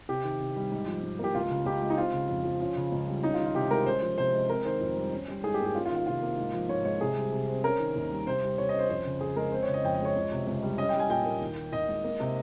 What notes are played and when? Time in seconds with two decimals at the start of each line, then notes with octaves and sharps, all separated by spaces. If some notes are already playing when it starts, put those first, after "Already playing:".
0.09 C3 G4
0.24 D#3
0.40 C3
0.56 G3
0.71 G#2
0.88 F3
1.03 G#2
1.19 A#3 G4
1.35 C#2 F4
1.50 C#3
1.66 C#2 G4
1.82 G#3
1.90 D#4
1.98 C4 F4
2.13 C#3
2.29 F2
2.45 F3
2.61 C#4 F4
2.76 C#3
2.92 C#2
3.08 G3
3.23 C#4 D#4
3.34 F4
3.39 D#3
3.44 F4
3.55 C3 G4
3.70 G#3 A#4
3.86 C#4 C5
4.02 F3
4.18 C3 C5
4.34 G#3
4.49 C4 A#4
4.65 D#3 C5
4.81 F2
4.97 G3
5.12 C#4
5.28 G3
5.44 G#2 G#4
5.54 G4
5.60 A#3
5.65 G4
5.75 C#4 F4
5.86 F4
5.91 D#3
5.96 F4
6.06 C3 F4
6.22 A#3
6.38 G#2
6.53 F3
6.69 G#2 C#5
6.85 G#3 C#5
7.01 C3 G#4
7.17 G3
7.32 C3
7.48 C4
7.64 C#4 A#4
7.80 D#3
7.96 D#2
8.11 G3
8.27 C3 C5
8.42 G3
8.58 C3 C#5
8.69 D#5
8.74 C#4 C5
8.90 F2 C5
9.06 C#3
9.21 F2 G#4
9.36 G#3 A#4
9.52 C4 C5
9.63 C#5
9.68 C#3
9.74 D#5
9.84 F2 G5
9.94 D#5
10.00 G#3
10.05 C#5
10.16 C#2
10.32 C3
10.47 C#2
10.62 G3
10.78 C#4 D#5
10.89 G5
10.94 G3
10.99 G#5
11.09 A#2 G5
11.26 A#3
11.41 D#2
11.57 D#3
11.72 D#2 D#5
11.89 G#3
12.04 A#3
12.20 C3